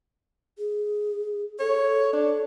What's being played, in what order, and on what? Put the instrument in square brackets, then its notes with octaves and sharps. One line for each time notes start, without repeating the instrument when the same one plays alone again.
[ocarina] G#4
[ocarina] A4 [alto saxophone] C#5
[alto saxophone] D4